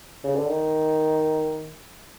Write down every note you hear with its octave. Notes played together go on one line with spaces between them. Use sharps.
C#3
D3
D#3